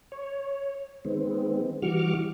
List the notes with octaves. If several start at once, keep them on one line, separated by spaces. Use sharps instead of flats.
C#5
D#3 G#3 B3 C4
E3 G3 F#4 C#6 D6 F6